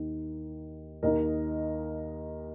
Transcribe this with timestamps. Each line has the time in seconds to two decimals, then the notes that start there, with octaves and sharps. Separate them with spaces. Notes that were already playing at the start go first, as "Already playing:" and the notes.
Already playing: D#2 D#3
1.03 D#2 D#3 A#4 D#5